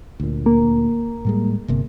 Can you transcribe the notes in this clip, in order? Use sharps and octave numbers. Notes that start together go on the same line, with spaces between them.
D2 A#2
A#3
A2 G3 G#3
G1 C3 A#3